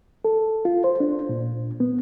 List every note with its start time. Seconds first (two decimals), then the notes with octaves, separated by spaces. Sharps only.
0.25 A4
0.65 F4
0.84 C5
1.00 D4
1.29 A#2
1.80 B3